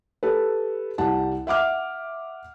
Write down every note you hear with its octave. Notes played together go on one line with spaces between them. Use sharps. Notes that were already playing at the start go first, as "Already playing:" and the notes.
G4 A4 B4
C2 G3 G4 F#5 A5
E5 F#5 D6 F6